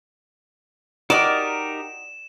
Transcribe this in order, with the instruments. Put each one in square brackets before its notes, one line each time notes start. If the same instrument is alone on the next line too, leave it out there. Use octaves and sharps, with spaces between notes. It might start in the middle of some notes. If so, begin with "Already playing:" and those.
[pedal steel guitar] D#4 G4 A#4 [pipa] F#4 D#5 [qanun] D5 [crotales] E7